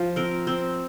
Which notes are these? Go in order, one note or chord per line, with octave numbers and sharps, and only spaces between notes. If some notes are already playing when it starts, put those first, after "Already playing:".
Already playing: F3
C4 A#4
C4